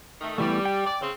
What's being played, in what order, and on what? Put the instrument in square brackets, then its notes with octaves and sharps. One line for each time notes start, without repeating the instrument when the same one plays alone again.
[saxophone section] D#3 A3
[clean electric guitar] E2 E3 A3 [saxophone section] G3
[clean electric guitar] G5
[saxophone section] D5
C#3 C4